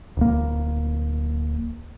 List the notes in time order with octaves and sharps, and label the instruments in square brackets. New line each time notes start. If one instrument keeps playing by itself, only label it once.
[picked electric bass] D1 A#3